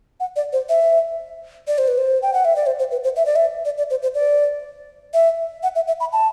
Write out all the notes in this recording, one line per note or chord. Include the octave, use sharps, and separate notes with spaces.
F#5
D5
C5
E5
D5
C5
B4
C5
G5
F#5
E5
D5
C5
C5
B4
C5
E5
D5
E5
D5
D5
C5
C5
D5
E5
F#5
E5
E5
B5
A5